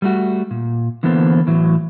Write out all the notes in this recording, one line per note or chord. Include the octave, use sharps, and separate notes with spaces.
G3 A3 F#4
A#2
D3 E3 A#3 B3 A4 C5
A2 E3 F#3